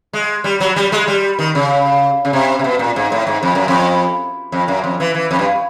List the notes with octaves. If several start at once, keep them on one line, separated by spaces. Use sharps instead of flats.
G#3
G3
F#3
G3
G#3
G3
D#3
C#3
C#3
C3
C3
B2
A#2
G#2
A2
G#2
F2
F#2
F2
F2
F#2
F2
E3
E3
F2
G2